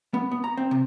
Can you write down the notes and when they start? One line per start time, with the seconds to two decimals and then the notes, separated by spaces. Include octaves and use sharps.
0.14 B3
0.31 B3
0.44 A#5
0.57 C4
0.71 C3